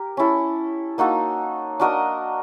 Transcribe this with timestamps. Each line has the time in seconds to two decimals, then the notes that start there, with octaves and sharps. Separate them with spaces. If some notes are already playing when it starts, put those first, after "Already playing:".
Already playing: G4 A#4
0.17 C#4 E4 A4
0.98 A#3 D#4 F#4 A4
1.80 D4 F#4 A#4 D#5